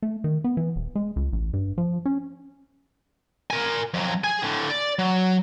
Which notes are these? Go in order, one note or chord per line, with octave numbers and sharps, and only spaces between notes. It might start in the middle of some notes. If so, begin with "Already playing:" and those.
A3
D#3
B3
E3
D#1
G#3
C#2
A1
G2
F3
C#4
A#4 G#5
F2 F#3
G#4 G#5
A2 D3
D5
F#3